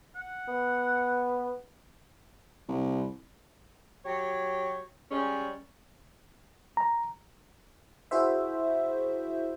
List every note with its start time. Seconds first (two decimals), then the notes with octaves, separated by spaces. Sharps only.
0.16 F#5
0.48 B3
2.68 C2
4.05 F#3 G4 C#5
5.10 G3 G#3 C#4
6.77 A#5
8.11 E4 F#4 G#4 C5 E5